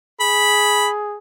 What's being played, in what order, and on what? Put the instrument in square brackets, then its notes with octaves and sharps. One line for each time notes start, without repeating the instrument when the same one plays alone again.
[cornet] G#4 [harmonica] B5